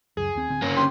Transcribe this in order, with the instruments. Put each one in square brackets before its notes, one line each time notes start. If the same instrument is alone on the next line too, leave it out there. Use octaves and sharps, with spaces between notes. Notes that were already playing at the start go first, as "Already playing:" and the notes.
[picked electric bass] C#2 F#2 [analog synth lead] G#4
[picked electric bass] D#2 C4
D1 D3 C4
[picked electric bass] G1 C#3 [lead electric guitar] A#3 C#4 [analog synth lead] A#5
[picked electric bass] F#1 F#2 D3 [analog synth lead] G4 [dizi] C6